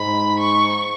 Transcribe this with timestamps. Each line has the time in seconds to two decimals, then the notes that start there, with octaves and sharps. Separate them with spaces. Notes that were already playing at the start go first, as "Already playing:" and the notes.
Already playing: G#2 B5
0.40 C#6